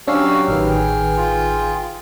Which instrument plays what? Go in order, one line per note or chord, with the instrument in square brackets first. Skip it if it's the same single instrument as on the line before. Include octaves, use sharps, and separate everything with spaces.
[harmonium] F#3 G4 [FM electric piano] C#4 D4 [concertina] F#4 F5 E6
[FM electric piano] A1 D#3 B4 [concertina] F6
[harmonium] G#4 G5
[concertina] F4